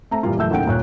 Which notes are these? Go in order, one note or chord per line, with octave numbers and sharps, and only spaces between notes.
A3 C4 A#5
A#2 E3 G3 A#3 F4
F#1 E3 A3 E5 E6 G6
D#2 A2 C#3 F#5 G5 D7
D#1 A#2 C#5 F#6